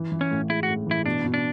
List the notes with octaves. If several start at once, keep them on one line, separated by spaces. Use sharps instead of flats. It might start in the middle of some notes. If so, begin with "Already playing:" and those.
Already playing: E3
E3
C#4
A2
G#3 E4
F#4
A2
E3 E4
B2 D4
B2
D4